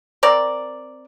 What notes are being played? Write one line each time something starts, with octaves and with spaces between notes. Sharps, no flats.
C4 A#4 D5